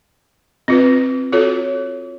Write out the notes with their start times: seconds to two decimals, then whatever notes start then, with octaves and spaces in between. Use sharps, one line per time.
0.68 C4 F4 B4
1.32 F4 F#4 A4 C#5